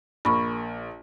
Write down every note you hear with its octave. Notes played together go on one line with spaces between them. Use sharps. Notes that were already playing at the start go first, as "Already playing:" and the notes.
A#1 A#4 B5 C#6